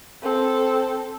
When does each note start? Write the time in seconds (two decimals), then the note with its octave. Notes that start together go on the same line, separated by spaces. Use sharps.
0.22 C4 A4